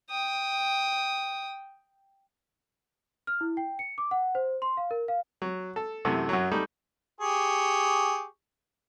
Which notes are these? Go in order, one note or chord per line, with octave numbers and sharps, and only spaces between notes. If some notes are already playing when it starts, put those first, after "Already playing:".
G5 D#6
F6
E4
G5
C#7
D6
F#5
C5
C6
F5
A#4
F5
F#3
A4
F#2 C3 E3 A3
F#2 F#3
G3 A3 D#4
G4 G#4 C#6